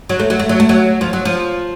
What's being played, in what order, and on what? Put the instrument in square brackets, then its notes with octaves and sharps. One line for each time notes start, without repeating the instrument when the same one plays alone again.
[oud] F#3
A3
F#3
A3
F#3
A3
F#3
F3
F#3
F3